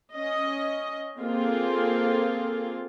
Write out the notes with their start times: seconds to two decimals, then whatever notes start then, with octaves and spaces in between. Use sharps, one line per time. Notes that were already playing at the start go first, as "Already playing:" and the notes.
0.13 C#4 D#5
1.19 A#3 C4 F4 G#4 A4